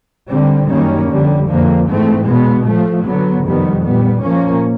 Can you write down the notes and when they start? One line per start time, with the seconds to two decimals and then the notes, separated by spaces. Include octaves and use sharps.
0.29 D3 G3 C4
0.68 F#2 D#3 G3 A#3 C#4
1.07 F2 D3 G3
1.47 F2 D3 F3 A#3
1.87 G#2 E3 A3 C4
2.26 B2 G#3 B3
2.65 A2 F3 A3
3.04 D3 F#3 B3
3.44 F2 C3 D#3 G3 B3
3.83 A#2 G3 B3
4.23 A#2 F3 A#3 C#4